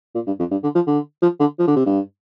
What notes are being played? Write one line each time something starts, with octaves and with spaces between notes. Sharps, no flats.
A#2
G2
F2
G2
D3
F3
D3
F3
D3
F3
D3
C3
G2